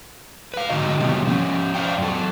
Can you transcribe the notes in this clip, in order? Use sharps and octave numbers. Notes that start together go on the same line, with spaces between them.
B4 F5
G#2 D3 D#4 F#4 D#5
C3 D#3 F#3 G3 A#3 B3
F3 C#4
C5 D5 F5 G5
F#2 A4